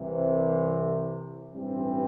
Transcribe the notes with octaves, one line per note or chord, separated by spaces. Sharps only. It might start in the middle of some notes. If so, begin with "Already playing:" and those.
Already playing: C2 C3 E3
A1 G2 E3 G3 C4